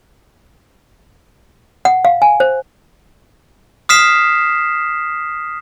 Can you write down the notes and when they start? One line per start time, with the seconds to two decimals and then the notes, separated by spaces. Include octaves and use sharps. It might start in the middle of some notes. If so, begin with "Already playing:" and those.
1.85 F#5
2.05 F5
2.22 G#5
2.40 C5
3.89 D#6 F6 B6 C7 E7